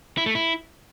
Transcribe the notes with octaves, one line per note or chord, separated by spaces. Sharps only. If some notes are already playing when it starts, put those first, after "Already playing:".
E4
A3
E4